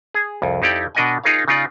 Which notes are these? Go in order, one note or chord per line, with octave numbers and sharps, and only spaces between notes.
G#4
C2 F2
F2 D#4 E4 G4 D5 G5
B2 D4 A#4 D#5 F#5 G#5
D#4 F4 G#4 A#4 C#5 F5
C#3 D#4 F4 D5